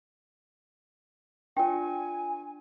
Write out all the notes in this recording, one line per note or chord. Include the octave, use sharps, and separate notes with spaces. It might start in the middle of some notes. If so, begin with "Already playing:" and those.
D4 F4 G5 G#5